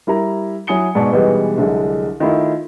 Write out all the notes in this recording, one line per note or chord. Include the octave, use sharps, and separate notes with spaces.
G3 E4 A#4 A#5
F#3 E4 G#5 D#6 C#7 G7
G#2 B2 D5 G#5 A5 C#6
B2 E3 G3 G#3 B3 D#4
C2 D3 F#3 G#3
D#3 A3 E4 F4